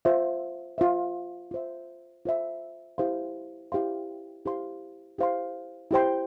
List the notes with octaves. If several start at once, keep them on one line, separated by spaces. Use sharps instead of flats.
F4 C5 E5
F4 C5 E5
F4 C5 E5
F4 C5 E5
E4 G4 C5 F5 C6
E4 G4 C5 F5 C6
E4 G4 C5 F5 C6
E4 G4 C5 F5 C6
E4 G4 C5 G5 C6